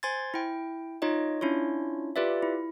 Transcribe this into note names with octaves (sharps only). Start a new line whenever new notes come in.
C5 G#5 C6 G#6 A6
E4 G5
D#4 F4 C#5 D#5
C#4 D4 E4 F4 C#5
F4 G4 B4 D5 E5
E4